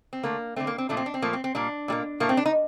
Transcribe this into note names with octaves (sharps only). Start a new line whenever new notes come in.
C4
D3 A3 A#3
D3 A3 C4
A#3
C4
A#2 F3 A3 D4
C4
D4
C4
A#2 F3 A3 A#3
C4
C4
A#2 G3 A#3 D4
A#2 G3 A#3
A2 A3 A#3
C4
D4
D#4